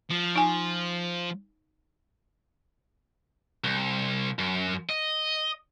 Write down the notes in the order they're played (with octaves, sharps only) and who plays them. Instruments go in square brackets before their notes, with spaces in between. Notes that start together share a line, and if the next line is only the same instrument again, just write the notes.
[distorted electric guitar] F3
[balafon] D#4 G#5
[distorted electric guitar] C2
F#2
D#5